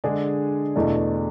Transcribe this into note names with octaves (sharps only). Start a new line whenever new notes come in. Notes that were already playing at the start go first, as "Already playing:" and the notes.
D3 G#3 D4 G#4
E2 B2 A3 D4